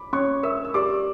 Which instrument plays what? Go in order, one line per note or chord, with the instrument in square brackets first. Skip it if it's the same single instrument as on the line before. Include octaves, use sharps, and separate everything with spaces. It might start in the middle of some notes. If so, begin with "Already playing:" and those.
Already playing: [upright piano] B5 D6
[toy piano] C#4 [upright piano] C#5 C#6
[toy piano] A#4 [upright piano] E5 E6
[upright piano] E6
[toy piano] G4 [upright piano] D5 D6